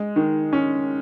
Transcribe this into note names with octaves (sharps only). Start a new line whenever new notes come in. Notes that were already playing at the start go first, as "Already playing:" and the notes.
Already playing: G#3
D#3
C#4